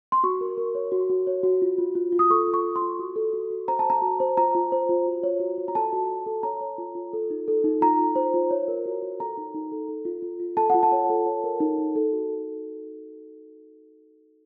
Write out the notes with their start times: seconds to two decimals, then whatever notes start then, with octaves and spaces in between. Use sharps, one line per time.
0.12 C6
0.23 F#4 C#6
0.41 A#4
0.57 A#4
0.75 C#5
0.92 F#4
1.10 F#4
1.27 C#5
1.43 F#4
1.62 F4
1.78 F4
1.95 F4
2.12 F4
2.19 D#6
2.30 A4 C#6
2.48 A4
2.54 C#6
2.65 F4
2.76 C6
2.82 F4
2.99 F#4
3.16 A4
3.33 F#4
3.50 F#4
3.68 C5 A#5
3.79 A5
3.85 C5 A#5
4.02 F#4
4.20 C5
4.37 F4 A#5
4.55 F4
4.72 C5
4.89 F4
5.06 F#4
5.23 C#5
5.40 F#4
5.58 F#4
5.68 A#5
5.75 A4 A5
5.93 F#4
6.09 F#4
6.26 A4
6.43 C#5 A#5
6.61 C#5
6.78 F4
6.95 F4
7.13 A4
7.30 D#4
7.48 A4
7.64 D#4
7.81 F4 A#5
7.99 F4
8.16 C5
8.34 F4
8.51 C#5
8.68 A#4
8.86 F#4
9.02 F#4
9.19 A4 A#5
9.37 D#4
9.54 D#4
9.72 A4
9.88 A4
10.05 F4
10.22 F4
10.40 F4
10.57 A4 A5
10.70 F4 F#5
10.83 A5
10.92 C#5
11.10 A4
11.26 C#5
11.44 A#4
11.60 D#4
11.78 D#4
11.96 A4
12.12 F#4